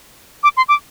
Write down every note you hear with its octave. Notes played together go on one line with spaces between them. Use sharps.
D6
C6
D6